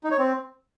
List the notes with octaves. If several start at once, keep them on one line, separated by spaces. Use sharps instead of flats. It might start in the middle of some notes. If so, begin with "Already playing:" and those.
D#4
C#5
C4